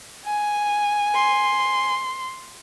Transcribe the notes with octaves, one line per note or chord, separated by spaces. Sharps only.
G#5
C6